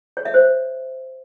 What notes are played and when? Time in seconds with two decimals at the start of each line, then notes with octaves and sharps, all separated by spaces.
0.17 C#5
0.25 E5
0.34 C5